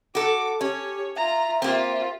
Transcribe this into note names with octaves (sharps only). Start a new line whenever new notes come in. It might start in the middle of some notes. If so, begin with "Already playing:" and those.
F#4 A4 D6
C#4 G4 C#5
F4 E5 A#5
A#3 C4 F4 G4